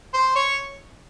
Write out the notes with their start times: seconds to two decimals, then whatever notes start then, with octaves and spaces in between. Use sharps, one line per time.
0.14 C5
0.36 C#5